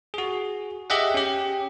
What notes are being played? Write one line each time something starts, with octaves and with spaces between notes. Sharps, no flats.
F#4 G#4
G4 G#4 D#5 E5 F#5
C#4 G4